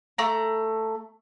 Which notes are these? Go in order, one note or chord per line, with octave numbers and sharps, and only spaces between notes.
A3 A#5